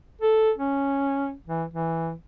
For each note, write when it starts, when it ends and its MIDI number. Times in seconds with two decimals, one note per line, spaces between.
0.21 0.51 69
0.58 1.34 61
1.47 1.64 52
1.73 2.13 52